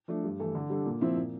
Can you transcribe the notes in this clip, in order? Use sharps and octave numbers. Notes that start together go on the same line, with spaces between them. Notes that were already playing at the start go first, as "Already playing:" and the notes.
F3 A3 D4
G2
E3 A3 E4 A4
D3
G3 D4 A4
A#2
F3 C4 E4
A#2